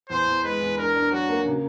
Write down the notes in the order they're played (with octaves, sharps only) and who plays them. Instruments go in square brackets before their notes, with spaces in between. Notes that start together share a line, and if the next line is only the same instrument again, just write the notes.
[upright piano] E2 [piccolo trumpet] C5
[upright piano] E2
[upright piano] G#3 [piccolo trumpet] B4
[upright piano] E2
[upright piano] D4 [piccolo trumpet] A#4
[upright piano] D4
[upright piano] F#3 [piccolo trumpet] F#4
[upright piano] A#3
C#3